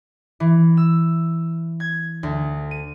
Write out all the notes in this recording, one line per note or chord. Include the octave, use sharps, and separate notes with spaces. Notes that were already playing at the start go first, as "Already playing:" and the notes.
E3
E6
G#6
D2
D#7